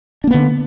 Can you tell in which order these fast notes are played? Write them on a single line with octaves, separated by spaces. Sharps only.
D4 A#3 B3 D3